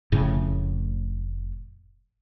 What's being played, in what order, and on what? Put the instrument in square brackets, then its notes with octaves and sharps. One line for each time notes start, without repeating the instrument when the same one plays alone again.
[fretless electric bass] F1 A2 C#3